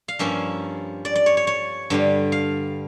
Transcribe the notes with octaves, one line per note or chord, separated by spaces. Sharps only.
F5
G2 F3 A#3 C#4 E5
D5
D5
C#5
C#5
C#5
G2 D3 G3
F5